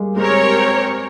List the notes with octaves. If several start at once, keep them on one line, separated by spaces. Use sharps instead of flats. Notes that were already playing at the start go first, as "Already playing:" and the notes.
Already playing: G3 G#3 A#3
G#3 C4 G4 A#4 C#5